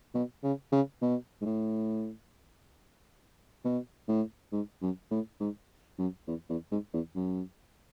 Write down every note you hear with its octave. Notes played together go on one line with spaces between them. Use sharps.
B2
C#3
C#3
B2
G#2
A2
B2
A2
G#2
F#2
A2
G#2
F#2
E2
E2
G#2
E2
F#2